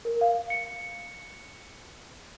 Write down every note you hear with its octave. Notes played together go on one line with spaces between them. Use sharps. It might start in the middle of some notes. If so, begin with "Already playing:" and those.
A#4
F5
C#7